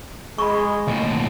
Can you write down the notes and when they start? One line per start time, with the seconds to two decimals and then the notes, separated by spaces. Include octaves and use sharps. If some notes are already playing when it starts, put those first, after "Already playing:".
0.38 G#3 B5 C#6
0.87 D#2 A2 D#5